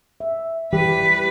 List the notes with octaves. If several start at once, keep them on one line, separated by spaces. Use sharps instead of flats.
E5
E3 G3 G4 B4